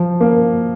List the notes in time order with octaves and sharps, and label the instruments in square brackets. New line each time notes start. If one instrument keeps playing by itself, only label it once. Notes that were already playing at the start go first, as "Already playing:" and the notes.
Already playing: [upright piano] F3
A#3